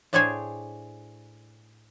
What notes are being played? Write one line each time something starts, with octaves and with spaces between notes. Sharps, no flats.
A2 D4 G#4 C5 C#5 G#5